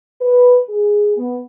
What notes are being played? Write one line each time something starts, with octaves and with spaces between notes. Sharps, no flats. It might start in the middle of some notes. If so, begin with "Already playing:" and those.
B4
G#4
B3